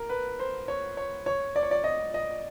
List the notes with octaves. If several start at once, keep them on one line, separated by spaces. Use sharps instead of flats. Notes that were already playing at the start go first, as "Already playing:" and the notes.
Already playing: A#4
B4
C5
C#5
C#5
C#5
D5
C#5
D5
D#5
D#5